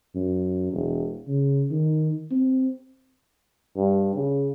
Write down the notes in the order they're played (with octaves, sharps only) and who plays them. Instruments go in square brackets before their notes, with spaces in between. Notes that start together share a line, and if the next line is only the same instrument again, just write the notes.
[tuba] F#2
E1
C#3
D#3
C4
[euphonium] G2
C#3